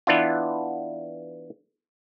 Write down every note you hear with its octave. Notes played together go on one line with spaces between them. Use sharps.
E3 B3 D4 E4 F4